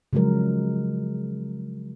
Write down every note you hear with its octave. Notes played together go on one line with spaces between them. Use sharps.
C#3 F3 F#3 G#3 A#4